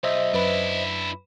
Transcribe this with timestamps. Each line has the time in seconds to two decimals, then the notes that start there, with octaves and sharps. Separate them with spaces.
0.03 B1 C5 D#5 E5
0.33 F#2 D4 E4 B4 B5